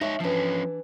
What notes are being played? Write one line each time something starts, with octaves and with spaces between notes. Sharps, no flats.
G#3 D#4 C#5 E5
E3 F3 C#4 D4